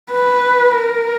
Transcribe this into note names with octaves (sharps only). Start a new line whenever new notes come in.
B4
A#4